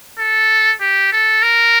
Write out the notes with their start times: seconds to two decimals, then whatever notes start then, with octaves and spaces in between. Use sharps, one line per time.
0.19 A4
0.81 G4
1.12 A4
1.42 A#4